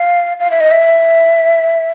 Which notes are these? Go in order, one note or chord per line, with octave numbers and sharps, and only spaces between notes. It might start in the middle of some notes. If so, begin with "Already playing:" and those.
Already playing: F5
F5
E5
D#5
E5